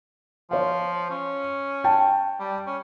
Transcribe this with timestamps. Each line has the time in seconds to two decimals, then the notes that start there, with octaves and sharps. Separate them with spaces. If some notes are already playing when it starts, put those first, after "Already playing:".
0.51 F3 C#5 F5
1.10 C#4
1.84 G5 A5
2.40 G3
2.67 C#4